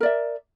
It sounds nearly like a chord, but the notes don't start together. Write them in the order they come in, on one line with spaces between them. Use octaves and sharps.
A#4 D5 E5